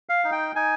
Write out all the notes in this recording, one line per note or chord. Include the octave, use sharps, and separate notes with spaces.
F5
D#4
G5
D#4 G#5